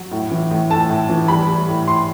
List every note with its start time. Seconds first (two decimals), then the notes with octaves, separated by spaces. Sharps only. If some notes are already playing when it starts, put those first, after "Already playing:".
Already playing: F#3
0.11 A2
0.31 E3
0.51 A2
0.70 A3 A5
0.89 A2
1.09 E3
1.28 G3 B5
1.49 G3
1.68 A2
1.87 A2 C6